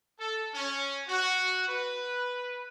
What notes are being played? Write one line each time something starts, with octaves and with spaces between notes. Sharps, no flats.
A4
C#4
F#4
B4